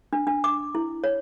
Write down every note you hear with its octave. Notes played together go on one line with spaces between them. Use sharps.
D4
D4
D6
E4
C#5